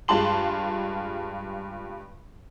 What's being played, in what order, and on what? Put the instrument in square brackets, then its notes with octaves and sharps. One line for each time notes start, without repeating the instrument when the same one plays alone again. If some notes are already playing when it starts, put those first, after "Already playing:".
[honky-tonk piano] G2 G#3 F4 A5 C6 F#7